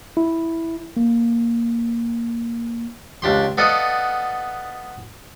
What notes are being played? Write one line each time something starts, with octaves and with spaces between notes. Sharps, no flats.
E4
A#3
C#2 D4 G4 C6
B3 A4 D5 D#5 F5 F#5